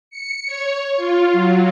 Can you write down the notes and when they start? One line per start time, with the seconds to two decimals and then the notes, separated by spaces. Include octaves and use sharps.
0.10 C#7
0.47 C#5
0.97 F4
1.33 F#3